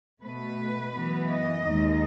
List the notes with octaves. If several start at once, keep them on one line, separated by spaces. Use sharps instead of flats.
B2 A3 B4
F#2 E3 B3
D#5
D#2 D#3 G#3